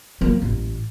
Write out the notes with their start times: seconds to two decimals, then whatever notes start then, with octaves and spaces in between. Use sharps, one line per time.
0.21 F#3 A#3
0.42 A1